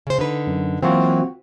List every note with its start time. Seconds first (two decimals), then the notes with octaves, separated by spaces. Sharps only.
0.07 C#3 C5
0.19 D3 D#4 B4
0.47 F#2
0.82 E3 F#3 A#3 C4 F4 F#4